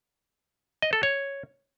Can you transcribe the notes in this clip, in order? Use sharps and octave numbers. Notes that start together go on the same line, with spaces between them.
D#5
A4
C#5